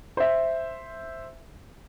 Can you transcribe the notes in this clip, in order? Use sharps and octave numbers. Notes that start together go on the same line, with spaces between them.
C5 E5